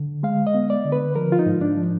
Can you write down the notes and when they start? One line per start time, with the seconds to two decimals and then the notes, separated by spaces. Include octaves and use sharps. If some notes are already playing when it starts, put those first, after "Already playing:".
Already playing: D3
0.23 G#3 F5
0.47 D#5
0.54 B3
0.70 D5
0.85 D3
0.92 B4
1.16 F3 A#4
1.32 F4
1.39 D#4
1.46 G#2
1.61 D4
1.77 F3